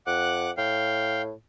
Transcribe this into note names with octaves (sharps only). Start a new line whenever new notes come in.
F2 F#5 D6 F#6
A2 F5 G5